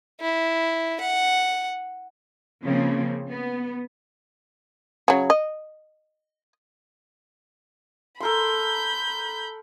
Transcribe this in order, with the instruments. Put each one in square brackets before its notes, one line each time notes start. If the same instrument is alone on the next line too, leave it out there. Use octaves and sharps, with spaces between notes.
[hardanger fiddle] E4
F#5
[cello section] C#3 F3 A#3 C4
B3
[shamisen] C#3 F#3
D#5
[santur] A4 A#4 C6 [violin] B5 G6